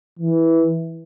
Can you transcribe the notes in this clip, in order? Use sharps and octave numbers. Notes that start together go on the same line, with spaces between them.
E3